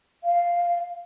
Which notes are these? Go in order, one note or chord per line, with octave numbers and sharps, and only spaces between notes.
F5